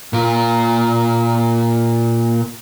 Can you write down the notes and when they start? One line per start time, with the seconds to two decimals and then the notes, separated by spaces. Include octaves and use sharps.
0.13 A#2 F4